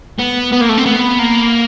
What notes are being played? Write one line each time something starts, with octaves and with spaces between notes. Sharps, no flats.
B3
B3
A#3
A3
C4
B3
A#3